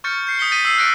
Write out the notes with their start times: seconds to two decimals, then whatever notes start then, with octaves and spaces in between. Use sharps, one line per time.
0.04 C#6 F6 G6 A6 C#7
0.27 G6 C7 C#7
0.39 D#6 G6 B6 C#7 G7
0.51 G6 A6 B6 D#7
0.65 E6 B6 C7
0.78 F6 F#6 A6 A#6 C#7 D7